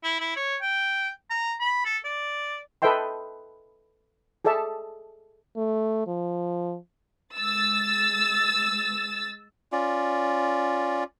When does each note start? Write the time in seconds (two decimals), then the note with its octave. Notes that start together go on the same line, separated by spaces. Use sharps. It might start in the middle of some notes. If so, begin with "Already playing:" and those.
0.04 E4
0.20 E4
0.36 C#5
0.61 G5
1.30 A#5
1.60 B5
1.85 A4
2.04 D5
2.82 A4 B4 D#5 E5 G5 C6
4.45 G#4 A4 D5 E5 A5
5.56 A3
6.07 F3
7.36 G#3 E6 A6
9.72 C#4 F4 D5